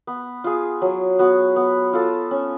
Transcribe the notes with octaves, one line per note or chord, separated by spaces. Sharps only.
B3
F4 G#4
F#3
B3 F#4
B3
F4 A4
C#4